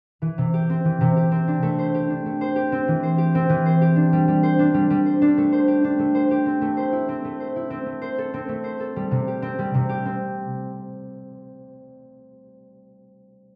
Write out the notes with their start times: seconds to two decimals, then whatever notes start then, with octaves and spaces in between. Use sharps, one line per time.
0.22 E3
0.38 C3
0.54 G4
0.70 C4
0.85 E3
1.01 C3
1.16 G4
1.31 C4
1.48 D4
1.62 A3
1.79 C5
1.94 G4
2.10 D4
2.26 A3
2.41 C5
2.56 G4
2.72 C4
2.88 E3
3.03 C5
3.18 G4
3.35 C4
3.49 E3
3.66 C5
3.81 G4
3.96 D4
4.13 G3
4.28 G3
4.43 C5
4.59 D4
4.74 G3
4.90 G3
5.06 C5
5.22 D4
5.38 A3
5.52 C5
5.68 G4
5.84 D4
5.99 A3
6.15 C5
6.31 G4
6.46 C4
6.61 A3
6.77 C5
6.92 E4
7.09 C4
7.25 A3
7.40 C5
7.56 E4
7.70 C4
7.86 A3
8.02 C5
8.18 A4
8.34 C4
8.49 A3
8.64 C5
8.80 A4
8.96 G3
9.11 C3
9.27 G4
9.42 C4
9.59 G3
9.74 C3
9.89 G4
10.05 C4